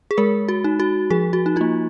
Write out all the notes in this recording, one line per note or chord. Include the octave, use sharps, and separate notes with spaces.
G#4
G#3 A#4
F#4
D#4
F#4
F3 G#4
F#4
D#4
A#3 D#4 F4